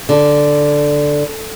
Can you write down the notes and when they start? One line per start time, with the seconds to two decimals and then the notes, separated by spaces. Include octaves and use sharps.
0.09 D3